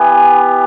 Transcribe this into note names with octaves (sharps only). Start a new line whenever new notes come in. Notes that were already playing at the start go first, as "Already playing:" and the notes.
Already playing: B3 E4 G4 G#5